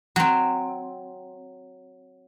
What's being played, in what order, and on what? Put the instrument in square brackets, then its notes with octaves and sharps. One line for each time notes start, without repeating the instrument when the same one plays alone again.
[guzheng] F#3 C4